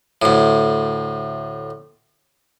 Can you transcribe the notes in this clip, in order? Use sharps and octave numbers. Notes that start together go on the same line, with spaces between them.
D2 A2